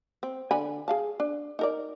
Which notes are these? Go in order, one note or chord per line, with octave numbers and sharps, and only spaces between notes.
C4
D3 G#5 B5
G#4 F5 A5
D4
D#4 A#4 D5